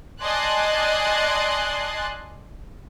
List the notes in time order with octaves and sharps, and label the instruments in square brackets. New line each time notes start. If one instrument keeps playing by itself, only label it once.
[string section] D5 D#5 G#5 A5 C6 F#6